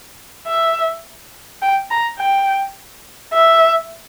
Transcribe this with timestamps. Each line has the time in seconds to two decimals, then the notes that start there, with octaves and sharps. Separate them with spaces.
0.47 E5
1.62 G5
1.91 A#5
2.19 G5
3.33 E5